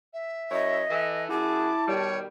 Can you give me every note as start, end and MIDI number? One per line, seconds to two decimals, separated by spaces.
0.13 1.03 76
0.51 0.84 42
0.51 0.84 64
0.51 0.84 73
0.51 1.24 75
0.91 1.29 52
0.91 1.29 69
1.30 1.71 42
1.30 1.93 64
1.30 1.71 66
1.30 1.71 68
1.30 2.13 81
1.30 1.88 86
1.88 2.26 47
1.88 2.26 51
1.88 2.26 55
1.88 2.19 73